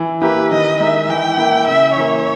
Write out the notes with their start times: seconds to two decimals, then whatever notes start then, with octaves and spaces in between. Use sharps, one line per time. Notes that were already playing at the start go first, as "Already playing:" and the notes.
Already playing: E3
0.22 A#3 E4 G4 A#4 B4
0.51 D#3 D#5
0.80 G#3 D#4 A#4 E5
1.09 E3 G5
1.38 A#3 E4
1.67 C#3 E5
1.96 E3 A#3 C#5